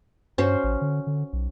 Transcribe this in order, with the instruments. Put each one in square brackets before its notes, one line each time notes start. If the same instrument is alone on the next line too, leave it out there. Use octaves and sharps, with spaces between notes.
[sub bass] G2 [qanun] C#4 F#4 C5
[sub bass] A1
D3
D3
B1